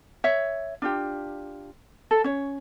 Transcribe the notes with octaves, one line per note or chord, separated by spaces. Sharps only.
C#5 E5
D4 F4 G4
A4
C#4 C#5